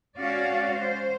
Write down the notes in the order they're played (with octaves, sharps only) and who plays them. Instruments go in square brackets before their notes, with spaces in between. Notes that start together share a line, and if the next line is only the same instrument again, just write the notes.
[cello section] G#3 C#4 F#4 D5 F5
C5